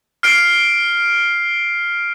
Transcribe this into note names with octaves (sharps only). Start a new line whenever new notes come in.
F6 C7 D7